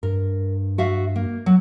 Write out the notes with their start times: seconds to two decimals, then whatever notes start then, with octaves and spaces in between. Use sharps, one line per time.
0.03 G2 A#4
0.78 F#4 E5 F5
1.16 A#3
1.46 F#3